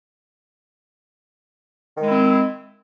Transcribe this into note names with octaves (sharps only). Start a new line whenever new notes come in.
D#3 G#3 C4 E4